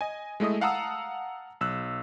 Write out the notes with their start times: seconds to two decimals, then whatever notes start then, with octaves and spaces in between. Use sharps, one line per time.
0.01 D#5 G#5
0.40 G#3 A3 E4 D#5 D#6
0.61 F5 F#5 A5 A#5 D#6 E6
1.61 B1 E6 F#6